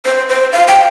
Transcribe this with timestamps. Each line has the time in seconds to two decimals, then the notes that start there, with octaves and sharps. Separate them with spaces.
0.06 C5
0.29 C5
0.53 F5
0.68 G5